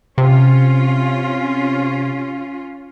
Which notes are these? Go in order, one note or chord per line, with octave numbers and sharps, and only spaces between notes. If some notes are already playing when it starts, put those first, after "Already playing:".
C3 C#4 F4